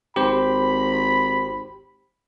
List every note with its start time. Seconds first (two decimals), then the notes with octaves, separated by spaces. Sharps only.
0.16 G#1 G4 C5 B5